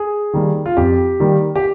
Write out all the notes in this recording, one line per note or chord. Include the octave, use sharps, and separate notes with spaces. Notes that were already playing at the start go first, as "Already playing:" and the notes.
Already playing: G#4
D#3 G3 A#3
F4
F2 G4
D#3 G3 A#3
G4